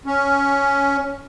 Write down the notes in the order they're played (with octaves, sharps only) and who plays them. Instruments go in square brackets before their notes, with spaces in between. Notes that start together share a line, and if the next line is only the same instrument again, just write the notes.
[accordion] C#4